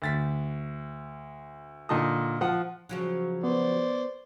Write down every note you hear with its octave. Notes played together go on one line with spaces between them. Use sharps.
D2 A6 B6
A#2 D3 D#4 A5 D#6
F3 F#5
C#3 F3 F#3
B3 C5 D5